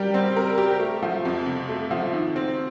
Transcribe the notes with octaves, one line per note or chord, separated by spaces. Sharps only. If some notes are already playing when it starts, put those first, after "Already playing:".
Already playing: G3 G4 A#4
C4
A#4
G4
A3
F3
F2
C3
A3
F3
D#3
C4